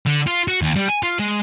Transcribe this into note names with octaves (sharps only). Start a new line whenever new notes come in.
D3
F4
F#4
D#2
G3
G#5
F4
G#3